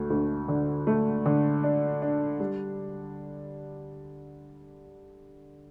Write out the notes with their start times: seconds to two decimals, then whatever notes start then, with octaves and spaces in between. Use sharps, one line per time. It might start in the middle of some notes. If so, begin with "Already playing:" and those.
Already playing: D2 A3
0.10 D2
0.48 D3
0.87 A3
1.26 D3
1.63 D4
2.02 D4
2.40 G3